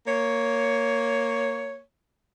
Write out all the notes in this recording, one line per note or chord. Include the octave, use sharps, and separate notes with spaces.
A#3 C#5